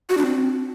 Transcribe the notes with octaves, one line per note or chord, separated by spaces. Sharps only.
F#4
D4
C4